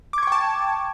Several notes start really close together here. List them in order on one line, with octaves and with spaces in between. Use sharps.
D6 G#6 C#6 G5 A5